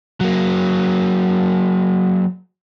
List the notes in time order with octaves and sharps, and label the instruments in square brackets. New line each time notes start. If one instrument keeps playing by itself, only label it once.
[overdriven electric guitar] F#3 A#3